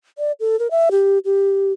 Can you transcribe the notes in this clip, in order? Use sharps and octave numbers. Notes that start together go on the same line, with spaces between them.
D5
A4
A#4
E5
G4
G4